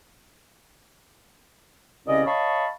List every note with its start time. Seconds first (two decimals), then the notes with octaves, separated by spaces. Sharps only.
2.07 C2 C#3 C#4 D5 D#5
2.25 C#5 D#5 F5 A5 B5 C#6